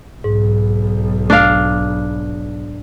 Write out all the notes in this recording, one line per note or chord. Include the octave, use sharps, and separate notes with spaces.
B1 G#2
D4 F5